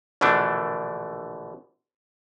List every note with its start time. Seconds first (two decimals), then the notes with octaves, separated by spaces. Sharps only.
0.21 A#1 B2 D3 E3 A3 D4